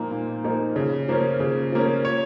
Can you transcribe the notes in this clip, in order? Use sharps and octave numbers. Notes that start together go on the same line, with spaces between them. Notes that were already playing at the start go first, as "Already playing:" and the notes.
Already playing: A#2 F3 A#3 D#4
A#2
F3 A#3 D#4
C#3
F3 A#3 C#4
C#3
F3 A#3 C#4
C#5